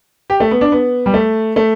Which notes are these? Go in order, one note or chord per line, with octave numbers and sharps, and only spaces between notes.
G4
A3
B3
D4
B3
G3
A3
A3